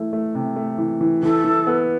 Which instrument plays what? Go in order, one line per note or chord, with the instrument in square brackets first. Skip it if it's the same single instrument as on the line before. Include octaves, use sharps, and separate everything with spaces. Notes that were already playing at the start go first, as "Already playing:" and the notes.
Already playing: [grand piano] E3 A3 E4
A3
C3
A3
E3
E3
[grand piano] E3 [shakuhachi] A4
[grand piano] E3
B3